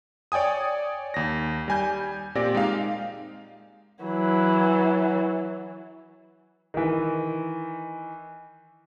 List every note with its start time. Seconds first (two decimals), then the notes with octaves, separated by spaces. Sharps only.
0.32 C#5 D5 G5 G#5 D#6
1.14 D#2 A#6
1.68 G3 G#5 G6
2.35 A#2 C4 G4 D5 A#6
2.55 G#3 D#4 F5
4.04 E3 F#3
6.74 D#3 E3